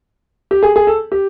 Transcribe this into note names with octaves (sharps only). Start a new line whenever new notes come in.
G4
G#4
G#4
A4
G4